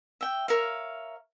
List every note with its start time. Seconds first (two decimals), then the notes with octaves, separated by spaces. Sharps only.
0.21 E5 G5
0.48 A#4 C#5 E5 F5